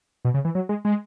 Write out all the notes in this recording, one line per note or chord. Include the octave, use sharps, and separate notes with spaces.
B2
C#3
E3
F#3
G#3
G#3